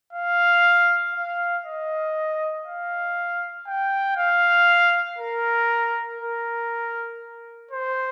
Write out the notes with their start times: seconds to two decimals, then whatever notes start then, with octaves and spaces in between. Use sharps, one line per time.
0.13 F5
1.14 F5
1.65 D#5
2.65 F5
3.67 G5
4.17 F5
5.18 A#4
6.20 A#4
7.71 C5